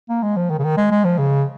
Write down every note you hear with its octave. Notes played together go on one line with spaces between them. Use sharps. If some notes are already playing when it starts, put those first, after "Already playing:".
A#3
G#3
F3
D#3
C#3
D#3
G#3
G#3
F3
C#3